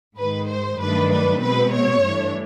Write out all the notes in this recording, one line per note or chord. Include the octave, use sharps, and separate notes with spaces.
G#2 D#3 G#3 B4
C5
G2 D#3 F#3 A3 D4 B4
B4
B2 G#3 C4 B4
C#5
G2 E3 A3 D4